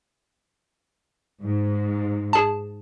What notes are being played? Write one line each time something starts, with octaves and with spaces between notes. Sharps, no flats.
G#2
G#4 A5